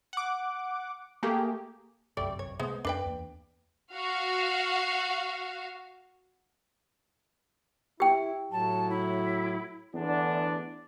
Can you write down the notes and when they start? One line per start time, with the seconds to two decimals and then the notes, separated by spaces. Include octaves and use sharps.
0.13 F#5 D6
1.23 A3 A#3 G4 G#4
2.17 G1 C2 F#2 G3 A3 D5
2.39 C#5
2.60 C3 G#3 A3 B3 C5
2.85 F2 D4 B4 G5
3.06 E2 A#3
3.92 F#4 F5
8.00 E4 G4 G5
8.51 A2 F#3 A5
8.89 E4
9.94 E2 A2 D3 D4